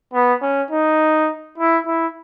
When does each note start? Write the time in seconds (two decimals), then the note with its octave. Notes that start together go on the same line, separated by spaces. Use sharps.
0.13 B3
0.42 C#4
0.70 D#4
1.58 E4
1.86 E4